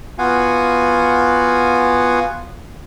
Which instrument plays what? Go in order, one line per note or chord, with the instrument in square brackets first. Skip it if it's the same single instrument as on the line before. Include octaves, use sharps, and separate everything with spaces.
[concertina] B3 F4 F#4 F5 F#5 G#5